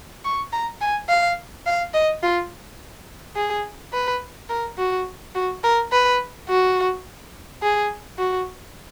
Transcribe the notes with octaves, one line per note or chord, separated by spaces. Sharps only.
C#6
A#5
G#5
F5
F5
D#5
F4
G#4
B4
A#4
F#4
F#4
A#4
B4
F#4
G#4
F#4